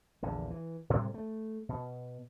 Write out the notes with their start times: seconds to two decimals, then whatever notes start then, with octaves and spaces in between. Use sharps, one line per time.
0.23 A#1 E2 D3
0.50 E3
0.90 A2 C3 G3 G#3
1.14 A3
1.69 B2